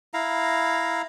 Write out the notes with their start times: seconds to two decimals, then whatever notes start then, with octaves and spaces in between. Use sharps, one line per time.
0.14 E4 F5 A#5